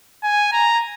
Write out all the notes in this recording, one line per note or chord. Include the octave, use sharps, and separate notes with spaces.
G#5
A#5